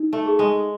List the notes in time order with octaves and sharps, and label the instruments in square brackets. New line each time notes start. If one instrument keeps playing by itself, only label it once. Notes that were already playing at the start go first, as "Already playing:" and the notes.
Already playing: [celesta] D#4
[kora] A3
[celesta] G#4
[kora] G#3